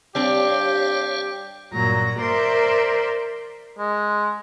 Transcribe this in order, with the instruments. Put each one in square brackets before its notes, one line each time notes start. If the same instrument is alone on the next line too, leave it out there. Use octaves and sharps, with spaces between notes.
[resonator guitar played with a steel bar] G3 C4 D4 [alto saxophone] G4 [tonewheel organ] C#5 F5
[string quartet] G2 A#2 F#3 A#5
A#4 C5 D5 E5 C6
[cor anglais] G#3